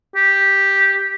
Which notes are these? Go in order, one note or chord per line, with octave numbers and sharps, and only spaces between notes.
G4